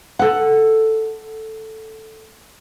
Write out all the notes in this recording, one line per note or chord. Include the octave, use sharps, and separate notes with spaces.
A4 F#5